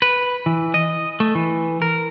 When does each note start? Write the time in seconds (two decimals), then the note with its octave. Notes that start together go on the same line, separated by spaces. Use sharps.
0.02 B4
0.46 E3
0.74 D#5
1.20 A3
1.35 E3
1.82 A#4